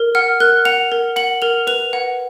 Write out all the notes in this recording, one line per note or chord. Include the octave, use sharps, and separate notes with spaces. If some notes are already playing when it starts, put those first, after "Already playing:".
Already playing: A#4
F#5 F6
A#4 F#6
F#5 F7
A#4
F#5 F#7
A#4 F7
B4 F7
F#5